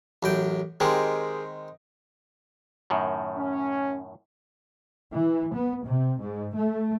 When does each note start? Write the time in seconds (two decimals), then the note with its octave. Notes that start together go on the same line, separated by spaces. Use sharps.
0.23 A1 F#2 G5
0.80 D#3 G#3 C4 G4 G#4 A#4
2.90 F#2 A2 D#3
3.37 C#4
5.12 E3
5.54 B3
5.84 C3
6.20 G#2
6.54 A3